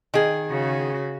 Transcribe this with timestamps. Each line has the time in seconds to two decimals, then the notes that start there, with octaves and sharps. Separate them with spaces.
0.14 D#3 G#4
0.51 C#3 F#4